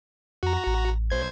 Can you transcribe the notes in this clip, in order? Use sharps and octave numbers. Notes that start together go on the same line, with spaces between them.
F2 F#4 A#5
A1
B1 C5 G#6